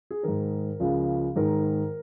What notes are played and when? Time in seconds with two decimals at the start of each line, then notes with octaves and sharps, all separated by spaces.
0.11 G#4
0.23 G#2 D#3 A#4
0.80 C#2 C#3 F3
1.36 G#2 D#3 A#4